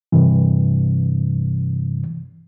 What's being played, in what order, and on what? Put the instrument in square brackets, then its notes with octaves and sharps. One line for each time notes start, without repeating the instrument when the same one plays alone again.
[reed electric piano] G2 C3 E3